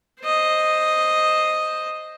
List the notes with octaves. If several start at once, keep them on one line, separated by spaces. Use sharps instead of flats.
C5 D#5